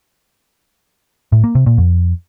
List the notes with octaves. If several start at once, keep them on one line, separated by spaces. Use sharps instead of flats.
A2
A#3
C3
A#2
F2